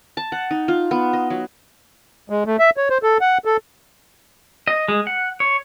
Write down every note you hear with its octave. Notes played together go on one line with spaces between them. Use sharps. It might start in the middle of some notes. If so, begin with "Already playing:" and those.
A5
F#5
D#4
F4
B3
D#5
F#3
G#3
A3
E5
C#5
C5
A4
F#5
A4
D#5
G#3
F#5
C#5